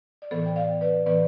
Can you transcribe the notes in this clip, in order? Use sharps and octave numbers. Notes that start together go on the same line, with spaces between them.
D5
A2 E3 B3 A4 C5
G5
D5 F5
B4 D5
A2 E3 B3 B4 D5